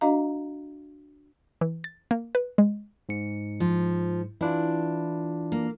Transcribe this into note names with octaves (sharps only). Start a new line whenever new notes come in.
D4 F#4 D#5 F5 A#5
E3
A6
A#3
B4
G#3
G#2 C#7
F3
E3 D4 E4 F4
A#3